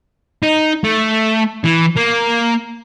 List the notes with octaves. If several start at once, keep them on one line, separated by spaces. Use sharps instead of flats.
D#4
A3
E3
A#3